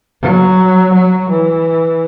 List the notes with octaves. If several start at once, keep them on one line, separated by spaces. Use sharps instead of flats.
F#3
F#3
E3